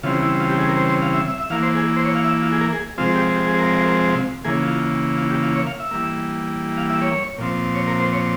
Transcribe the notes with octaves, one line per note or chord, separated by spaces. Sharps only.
C#3 E3 G3 C4 F4
E4
F4
G4
G#4
A#4
C5
C5
F5
E5
E5
E5
E3 A#3 F5
C5
G#4
C5
C#5
F5
E5
F4
G#4
A#4
G#4
C3 F3 G#3 C4 F4
G4
G4
G#4
A#4
C#3 E3 A#3 G#4
F4
F4
G4
F4
C#5
F5
E5
E3 G3 A#3
F5
E5
C#5
A#2 F3 C4
C#5
A#4
C5
C#5